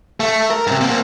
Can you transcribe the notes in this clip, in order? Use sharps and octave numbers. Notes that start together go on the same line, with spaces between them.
A3
A#4
G2 C3
A#3 C4